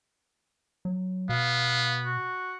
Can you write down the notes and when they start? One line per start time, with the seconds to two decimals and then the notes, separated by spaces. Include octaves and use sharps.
0.85 F#3
1.29 B2 B3 F5
2.06 F#4